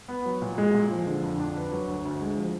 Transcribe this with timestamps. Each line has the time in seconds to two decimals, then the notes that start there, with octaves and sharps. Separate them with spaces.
0.08 B3
0.26 F#3
0.42 A#2
0.58 G#3
0.74 A#2
0.91 F3
1.07 D3
1.23 F2
1.40 D4
1.56 B4
1.72 F#3
1.88 D2
2.05 D2
2.21 G#3
2.37 F3